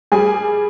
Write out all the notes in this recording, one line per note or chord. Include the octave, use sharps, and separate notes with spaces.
G3 G#4 G#5